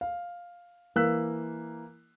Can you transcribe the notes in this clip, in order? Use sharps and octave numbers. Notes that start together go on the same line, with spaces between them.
F5
E3 A#3 E6 F#6 B6